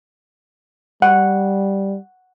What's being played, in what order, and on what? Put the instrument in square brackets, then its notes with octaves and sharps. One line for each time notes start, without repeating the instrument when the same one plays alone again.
[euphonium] G3 [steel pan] F#5